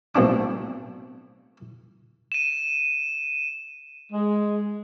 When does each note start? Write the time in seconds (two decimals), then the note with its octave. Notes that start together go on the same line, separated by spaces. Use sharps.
0.15 B1 A2 C4 D4 D6
2.32 D#7 E7
4.13 G#3